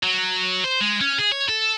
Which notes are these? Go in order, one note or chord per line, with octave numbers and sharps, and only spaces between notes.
F#3
C5
G#3
C#4
G#4
C#5
A4